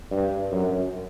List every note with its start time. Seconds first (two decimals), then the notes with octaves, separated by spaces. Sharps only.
0.11 G2
0.52 F#2